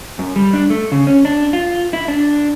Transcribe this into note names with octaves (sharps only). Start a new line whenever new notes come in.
F#2
G3
D4
A3
C#3
C#4
D4
F4
E4
D4